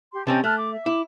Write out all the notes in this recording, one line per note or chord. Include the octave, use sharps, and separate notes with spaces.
G4 C6
C3 C4 C#4 D#5 G5 A5
A3 A5 F6 F#6
D6
E5
E4 D6